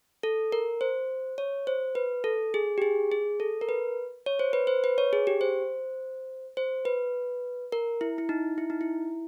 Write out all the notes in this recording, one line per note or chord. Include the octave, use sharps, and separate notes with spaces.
A4
A#4
C5
C#5
C5
B4
A4
G#4
G4
G#4
G#4
A4
A#4
B4
C#5
C5
B4
C5
B4
C#5
G#4
G4
C5
C5
B4
A#4
E4
E4
D#4
E4
D#4
E4